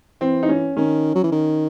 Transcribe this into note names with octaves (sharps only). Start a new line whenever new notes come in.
E3 C4
D#4
C#4
D#3 C#4
F#3
E3
D#3